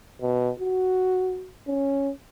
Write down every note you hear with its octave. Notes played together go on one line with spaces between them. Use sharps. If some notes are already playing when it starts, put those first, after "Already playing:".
B2
F#4
C#4